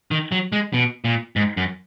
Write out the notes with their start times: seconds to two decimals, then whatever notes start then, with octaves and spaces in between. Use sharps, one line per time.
0.11 D#3
0.32 F#3
0.52 G#3
0.74 B2
1.05 A#2
1.36 G#2
1.57 F#2